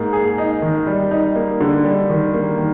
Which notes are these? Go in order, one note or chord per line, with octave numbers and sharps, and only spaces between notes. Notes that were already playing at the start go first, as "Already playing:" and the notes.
Already playing: G#2 A#3
G#4
D#4
D#3
G3
D#4
A#3
D3
G3
D#3
A#3
D#3